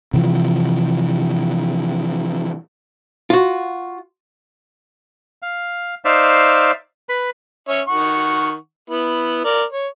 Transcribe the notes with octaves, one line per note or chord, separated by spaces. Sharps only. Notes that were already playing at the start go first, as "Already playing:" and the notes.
C3 E3 F3
F4 F#4
F5
D#4 C5 D5 E5 F5
B4 B5
C#4 C#5 E5
D#3 F#5 C#6
B3 E4
A#4 D5
C#5